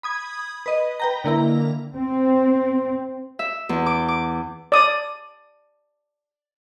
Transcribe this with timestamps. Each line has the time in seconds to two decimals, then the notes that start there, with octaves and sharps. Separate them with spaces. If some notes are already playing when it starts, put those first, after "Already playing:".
0.03 B5 D#6 G#6
0.66 B4 D#5
1.00 B4 G5 A#5
1.24 D3 A#3 E4 A#5
1.94 C4
3.39 E5
3.69 E2
3.86 D6
4.08 D6
4.72 D5 D#6